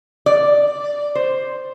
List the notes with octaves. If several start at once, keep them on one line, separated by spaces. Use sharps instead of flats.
D5
C5